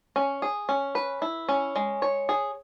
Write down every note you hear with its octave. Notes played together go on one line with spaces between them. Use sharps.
C#4
G#4
C#4
B4
E4
C#4
G#3
C#5
G#4